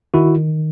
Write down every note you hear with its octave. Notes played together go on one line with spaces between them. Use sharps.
D#3 E4 F#4